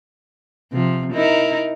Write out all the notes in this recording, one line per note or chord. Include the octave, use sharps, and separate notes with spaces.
C3 F3
D#4 E4 A#4